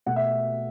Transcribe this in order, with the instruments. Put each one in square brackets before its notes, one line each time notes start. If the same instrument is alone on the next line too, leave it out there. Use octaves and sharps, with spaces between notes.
[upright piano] B2 A3 F#5
E5